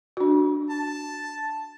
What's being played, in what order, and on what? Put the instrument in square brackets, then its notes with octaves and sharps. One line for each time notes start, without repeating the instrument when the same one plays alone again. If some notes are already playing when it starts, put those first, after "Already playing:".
[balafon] D4 F#4
[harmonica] A5